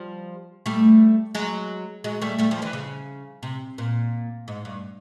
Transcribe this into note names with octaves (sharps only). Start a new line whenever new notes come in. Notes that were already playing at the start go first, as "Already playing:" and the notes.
Already playing: F3 G3
G3 A3
F#3 G#3
F#3 G#3
G3 A3
G3 A3
F3 G3
D3 E3
C#3
C3
A#2
G#2
G2